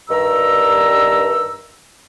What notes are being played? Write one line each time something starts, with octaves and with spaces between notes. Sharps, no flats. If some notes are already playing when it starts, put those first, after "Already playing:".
G2 D#3 A#5 E6